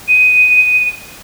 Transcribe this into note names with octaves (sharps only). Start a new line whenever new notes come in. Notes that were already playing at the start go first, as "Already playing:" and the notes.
D#7